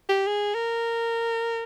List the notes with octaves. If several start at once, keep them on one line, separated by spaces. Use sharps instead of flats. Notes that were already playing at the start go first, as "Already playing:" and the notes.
G4
G#4
A#4